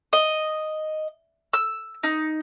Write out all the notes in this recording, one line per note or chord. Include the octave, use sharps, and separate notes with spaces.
D#5
E6
D#4